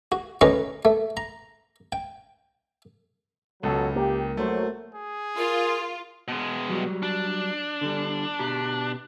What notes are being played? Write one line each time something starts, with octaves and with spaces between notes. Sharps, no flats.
F#4
D2 C#4 B4 D#5 A#5 C#6
A3
A#5
G5
C#2 B2 F#3 A4
A#3 G4
C2 F#3 A3 C5
G#4
F4 A#4
B2 G#3
F#3 G3
D4
D3 G3
B2 G4 A#5